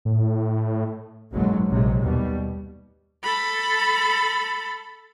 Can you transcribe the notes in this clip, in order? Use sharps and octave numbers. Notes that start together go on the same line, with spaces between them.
A2
F#1 B1 G#2 B2 F#3
A#1 C3 F#3 G#3
D#2 B2 G3
A4 B5